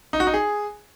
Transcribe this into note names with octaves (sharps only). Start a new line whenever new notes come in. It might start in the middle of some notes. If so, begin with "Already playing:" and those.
D#4
F#4
D#4
G#4